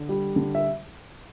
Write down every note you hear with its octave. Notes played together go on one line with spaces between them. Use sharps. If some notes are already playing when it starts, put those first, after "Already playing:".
Already playing: D3
G3
D3
E5